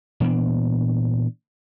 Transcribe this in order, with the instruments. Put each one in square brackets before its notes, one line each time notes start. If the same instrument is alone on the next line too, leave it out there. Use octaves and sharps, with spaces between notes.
[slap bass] A#2 E3 B3 D4